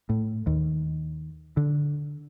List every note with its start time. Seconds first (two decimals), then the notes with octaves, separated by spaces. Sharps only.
0.09 A2
0.47 D#2
1.57 D3